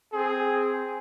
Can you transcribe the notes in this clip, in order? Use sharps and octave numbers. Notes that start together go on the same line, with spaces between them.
C4 G#4